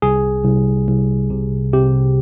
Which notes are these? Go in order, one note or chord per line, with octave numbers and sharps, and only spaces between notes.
C2 G#4
C2
C2
C3
C3 G4